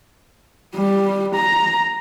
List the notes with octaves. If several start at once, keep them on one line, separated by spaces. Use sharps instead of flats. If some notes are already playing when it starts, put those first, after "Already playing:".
G3
A#5